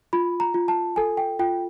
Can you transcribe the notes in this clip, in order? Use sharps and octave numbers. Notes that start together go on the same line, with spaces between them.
F4 B5
A#5
F4
A5
A4 G#5
G5
F4 G5